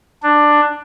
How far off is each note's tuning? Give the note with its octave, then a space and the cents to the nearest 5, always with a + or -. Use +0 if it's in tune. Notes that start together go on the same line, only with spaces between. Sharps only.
D4 +10